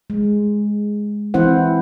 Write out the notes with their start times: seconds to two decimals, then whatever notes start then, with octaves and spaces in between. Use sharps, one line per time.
0.10 G#3
1.34 E3 C4 E4 C5 F#5